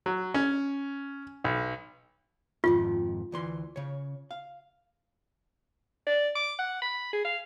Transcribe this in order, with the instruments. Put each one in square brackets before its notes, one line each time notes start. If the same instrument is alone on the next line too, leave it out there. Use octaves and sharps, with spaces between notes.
[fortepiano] F#3
C#4
B1
[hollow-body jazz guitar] F2 G#2 D#3 [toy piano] F4
[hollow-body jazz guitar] D2 E3 C6
C#3 C#5
F5
[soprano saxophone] D5
D6
F#5
B5
G#4
F5